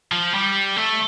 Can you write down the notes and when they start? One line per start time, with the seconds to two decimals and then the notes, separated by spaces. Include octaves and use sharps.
0.12 F3
0.34 G3
0.77 A3